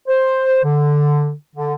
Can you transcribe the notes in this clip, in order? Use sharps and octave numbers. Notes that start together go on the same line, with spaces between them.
C5
D3
D3